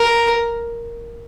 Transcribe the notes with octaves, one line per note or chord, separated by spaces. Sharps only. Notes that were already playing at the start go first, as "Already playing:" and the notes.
Already playing: A#4